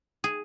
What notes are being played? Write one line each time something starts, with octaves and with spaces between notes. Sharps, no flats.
G#4